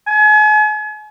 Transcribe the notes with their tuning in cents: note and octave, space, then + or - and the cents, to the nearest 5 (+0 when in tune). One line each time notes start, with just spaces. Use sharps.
G#5 +40